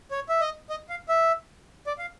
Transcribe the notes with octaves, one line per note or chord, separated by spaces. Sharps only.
C#5
E5
D#5
D#5
F5
E5
D5
F5